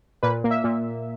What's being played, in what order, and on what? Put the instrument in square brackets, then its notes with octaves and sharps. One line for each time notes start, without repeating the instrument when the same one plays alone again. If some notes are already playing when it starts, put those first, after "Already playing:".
[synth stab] A#2 B4
A#3
E5
A#2